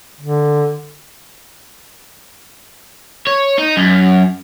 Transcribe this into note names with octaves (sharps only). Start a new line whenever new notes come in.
D3
C#5
D#4
F#2